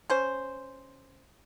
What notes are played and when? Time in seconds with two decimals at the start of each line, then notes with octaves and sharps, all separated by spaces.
0.10 C#4 C5